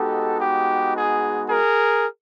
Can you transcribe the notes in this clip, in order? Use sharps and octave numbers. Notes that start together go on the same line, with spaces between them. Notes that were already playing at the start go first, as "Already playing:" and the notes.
Already playing: G#3 B3 D#4 F#4 G4 A4
G4
G#4
G#4 A#4